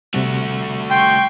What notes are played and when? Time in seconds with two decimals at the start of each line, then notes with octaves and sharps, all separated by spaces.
0.14 C3 G3 A3 F#4
0.90 G5 C6 C#6